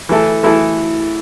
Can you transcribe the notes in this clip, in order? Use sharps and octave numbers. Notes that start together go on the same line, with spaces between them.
E3 A3 E4 A4
E3 A3 E4 A4